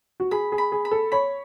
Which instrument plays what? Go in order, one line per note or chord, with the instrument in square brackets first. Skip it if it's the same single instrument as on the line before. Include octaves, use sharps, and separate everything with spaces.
[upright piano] F#4
[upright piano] G#4 [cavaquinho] B5
[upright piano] G#4
[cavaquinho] B5
[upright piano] G#4
[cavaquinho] B5
[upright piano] A4
[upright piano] C#5 [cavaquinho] B5